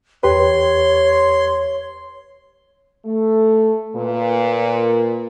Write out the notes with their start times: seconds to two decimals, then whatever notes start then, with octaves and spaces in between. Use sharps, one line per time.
0.23 E2 G4 B4 C#5 C6
3.05 A3
3.96 A#2 B4